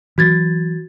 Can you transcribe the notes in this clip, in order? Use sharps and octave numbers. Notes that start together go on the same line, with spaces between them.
E3 F#3 F#4 G#6 A6